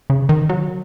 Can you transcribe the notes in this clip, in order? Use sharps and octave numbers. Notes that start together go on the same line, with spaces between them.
C#3
D#3
F#3